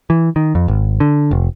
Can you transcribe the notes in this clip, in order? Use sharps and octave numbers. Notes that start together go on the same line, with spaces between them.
E3
D#3
F2
G#1
D3
F1